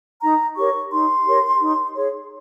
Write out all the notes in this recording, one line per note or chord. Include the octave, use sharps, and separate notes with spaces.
D#4 A#5
G4 A#4 C#5 C#6
D#4 C6
G4 A#4 C#5
D#4
G#4 C#5